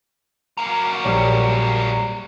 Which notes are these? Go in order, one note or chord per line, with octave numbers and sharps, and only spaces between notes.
F#3 A#3
A#1 G3 C#5